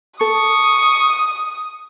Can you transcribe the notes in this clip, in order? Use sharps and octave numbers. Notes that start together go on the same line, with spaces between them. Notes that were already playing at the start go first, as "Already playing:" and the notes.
A4 C#6 D#6